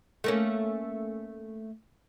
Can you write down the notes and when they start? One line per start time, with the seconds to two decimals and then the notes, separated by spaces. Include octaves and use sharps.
0.24 A3 A#3 C#4